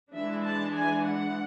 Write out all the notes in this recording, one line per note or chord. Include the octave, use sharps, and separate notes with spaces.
E3 G#3 D4 E5
A5
G#5
F#5